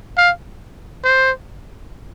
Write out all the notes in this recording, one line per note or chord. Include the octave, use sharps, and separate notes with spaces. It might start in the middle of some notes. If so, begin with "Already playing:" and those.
F5
C5